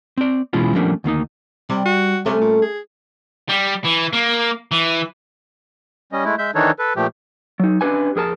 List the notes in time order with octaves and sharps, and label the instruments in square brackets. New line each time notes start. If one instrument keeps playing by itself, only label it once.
[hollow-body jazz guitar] C4 D5
B2 E3 G#3 C#4 E4 F4
F3 G3 A3 A#3 C#4 D4
D2 D#3 A#3 D#4
[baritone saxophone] C3 [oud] G3
[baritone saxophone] F#4
[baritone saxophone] C3 [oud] A3 C#4
[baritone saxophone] A#2
G#4
[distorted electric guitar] G3
E3
A#3
E3
[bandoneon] G3 C#4 D#5
G#3 A3 E4
G#3 E5 G6
D#3 E3 D4 D#4 A4 C#5
A4 B4
A#2 F3 A3 G4
[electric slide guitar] F#3 D#4
C#4 D4 G4 B4 G#5
F2 G#4 A#4 A5